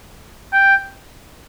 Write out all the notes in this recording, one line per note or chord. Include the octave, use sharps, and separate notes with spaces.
G5